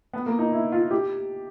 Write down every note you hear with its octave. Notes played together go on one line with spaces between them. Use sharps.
B3
A#3
D#4
E4
F4
G4